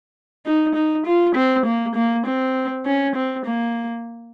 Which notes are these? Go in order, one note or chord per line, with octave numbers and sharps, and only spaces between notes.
D#4
D#4
F4
C4
A#3
A#3
C4
C#4
C4
A#3